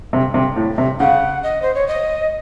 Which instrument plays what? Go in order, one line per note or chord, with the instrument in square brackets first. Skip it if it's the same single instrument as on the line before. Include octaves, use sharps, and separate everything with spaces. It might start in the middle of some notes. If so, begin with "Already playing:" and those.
[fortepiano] C3
C3
A2
C3
[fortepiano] C#3 [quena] F#5
[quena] D#5
C5
C#5
D#5